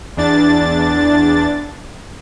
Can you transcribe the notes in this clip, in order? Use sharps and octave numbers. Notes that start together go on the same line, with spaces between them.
E2 D4 A6